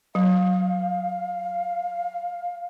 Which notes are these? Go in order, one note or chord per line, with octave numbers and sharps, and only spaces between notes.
F#3 F5